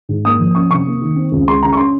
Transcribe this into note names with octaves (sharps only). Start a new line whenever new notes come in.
G#2
A#3 D#6
F3
C#4 C#6
C3 C#6
A#3
D#3
C4
C#2
G#3 C6
C#3 A#5
C#6
C#4 C6